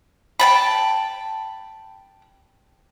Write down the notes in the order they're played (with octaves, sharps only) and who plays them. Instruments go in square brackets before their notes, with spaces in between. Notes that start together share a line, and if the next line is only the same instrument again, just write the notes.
[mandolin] G5 A5 B5